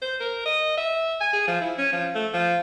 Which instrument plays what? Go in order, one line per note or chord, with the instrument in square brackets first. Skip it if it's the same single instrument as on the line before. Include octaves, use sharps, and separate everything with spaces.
[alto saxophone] C5
A#4
D#5
E5
G#5
G#4
F3
E4
C#4
F3
A3
F3